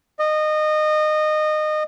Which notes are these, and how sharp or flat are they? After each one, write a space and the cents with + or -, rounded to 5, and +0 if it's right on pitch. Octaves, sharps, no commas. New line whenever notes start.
D#5 -20